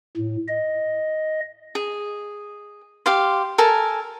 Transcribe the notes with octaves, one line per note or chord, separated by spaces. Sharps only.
A2
D#5
G#4
G4 F5 C6
A4 A#4 G#5